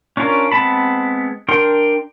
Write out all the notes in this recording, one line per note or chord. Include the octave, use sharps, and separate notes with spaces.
C#4 D4 F4 A#4
G#3 B3 C4 A5 B5
D4 A#4 G5 C6